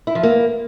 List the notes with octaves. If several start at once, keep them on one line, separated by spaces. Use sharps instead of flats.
E4
F3
A#3